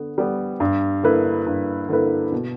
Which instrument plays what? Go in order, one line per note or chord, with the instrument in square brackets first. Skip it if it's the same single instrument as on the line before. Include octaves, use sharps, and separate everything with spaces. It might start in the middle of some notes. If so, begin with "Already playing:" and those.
Already playing: [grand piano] D3 B3
G3 B3
G2
D3 A#3 E4 B4
G2
D3 A#3 E4 B4
B2